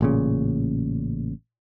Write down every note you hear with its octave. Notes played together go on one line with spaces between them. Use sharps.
A1 A#2 C#3